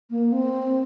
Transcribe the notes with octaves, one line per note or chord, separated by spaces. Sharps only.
A#3
C4